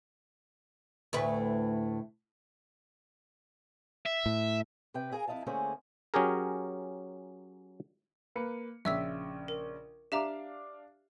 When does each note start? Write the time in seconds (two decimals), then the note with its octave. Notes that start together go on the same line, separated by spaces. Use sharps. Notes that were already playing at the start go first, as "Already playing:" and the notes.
1.13 D2 A2 B4
4.06 E5
4.26 A2
4.94 C3 B4 G5
5.12 E4 G#4 A#4 B4 F5 G#5
5.28 F2 E4 D#5 F5 A5
5.46 D3 A3 A#3 C#4 G#4 C5
6.14 F#3 C#4 G4 G#4 A#4
8.36 A#3 B4 C#7
8.85 A#1 C#3 E5 E6 B6
9.48 A#4
10.12 D4 G4 E5 F5 A#5 D6